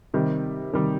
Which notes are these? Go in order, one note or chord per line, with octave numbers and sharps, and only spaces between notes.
C3 D#3 G3
C3 D#3 G3